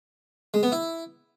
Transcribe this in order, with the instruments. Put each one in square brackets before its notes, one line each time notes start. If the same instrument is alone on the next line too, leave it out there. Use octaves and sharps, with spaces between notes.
[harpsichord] G#3
B3
E4